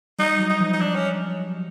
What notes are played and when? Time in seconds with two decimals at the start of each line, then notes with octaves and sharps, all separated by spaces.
0.19 G3 D#4
0.39 F#3
0.50 D#4
0.60 F3
0.73 D#4
0.81 D4
0.95 C#4